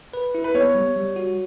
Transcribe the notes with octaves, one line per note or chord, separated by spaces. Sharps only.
B4
E4
B4
B3 C#5
G3
G3
F#4